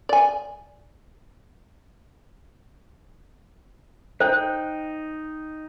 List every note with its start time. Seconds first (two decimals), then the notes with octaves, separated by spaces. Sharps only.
0.09 D5 G#5
4.20 D#4 C5 G5 G6